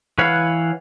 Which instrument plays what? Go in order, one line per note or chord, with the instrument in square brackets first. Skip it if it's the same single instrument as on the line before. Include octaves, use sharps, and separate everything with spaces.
[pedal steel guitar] E3 B4 C#5 F5 F#5